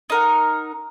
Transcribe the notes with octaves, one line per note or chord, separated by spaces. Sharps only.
D#4 A#4 F#5